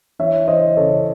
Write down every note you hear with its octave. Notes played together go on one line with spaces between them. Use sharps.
E3 C#5 E5
E3 C5 D#5
C#3 A4 C#5